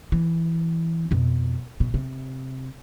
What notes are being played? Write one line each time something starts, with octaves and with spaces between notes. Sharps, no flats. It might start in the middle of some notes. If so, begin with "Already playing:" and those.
E3
F2 B2
B2
C3